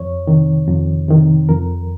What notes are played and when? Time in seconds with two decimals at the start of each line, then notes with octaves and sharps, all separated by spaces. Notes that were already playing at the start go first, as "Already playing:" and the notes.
Already playing: F2 C#5
0.27 C3 D#3
0.68 F2
1.08 C3 D#3
1.48 F2 A#4